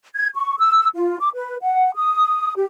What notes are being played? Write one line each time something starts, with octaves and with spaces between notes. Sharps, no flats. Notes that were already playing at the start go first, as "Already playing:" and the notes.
G#6
C#6
E6
F4
D6
B4
F#5
D#6
G4